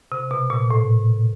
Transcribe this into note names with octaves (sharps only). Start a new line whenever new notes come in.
C3
B2
A#2
A2